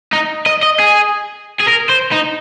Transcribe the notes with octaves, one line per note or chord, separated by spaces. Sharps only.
D#4
D#5
D#5
G#4
G#4
A#4
C5
D#4